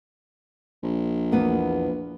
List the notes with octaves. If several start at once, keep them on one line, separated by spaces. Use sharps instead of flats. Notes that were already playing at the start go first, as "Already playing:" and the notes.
A#1
E2 A#3 B3